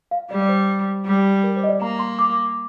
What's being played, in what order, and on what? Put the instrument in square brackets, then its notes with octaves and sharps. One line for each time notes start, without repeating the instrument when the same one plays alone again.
[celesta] F5
[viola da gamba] G3 [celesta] D5
[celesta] D5
C5
[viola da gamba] G3
[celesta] A#4
C5
D#5
D5
[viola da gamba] A#3 [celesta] A#5
[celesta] C6
D6